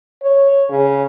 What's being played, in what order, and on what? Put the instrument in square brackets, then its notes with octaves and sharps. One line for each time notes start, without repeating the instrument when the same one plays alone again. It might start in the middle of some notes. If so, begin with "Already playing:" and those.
[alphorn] C#5
C#3